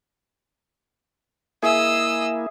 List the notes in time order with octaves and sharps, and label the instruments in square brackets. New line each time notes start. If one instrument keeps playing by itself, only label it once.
[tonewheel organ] A#3 E4 [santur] G#4 E5 [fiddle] D#5 E6